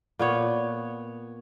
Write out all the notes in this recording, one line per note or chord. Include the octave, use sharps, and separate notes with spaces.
A#2 B3 C#5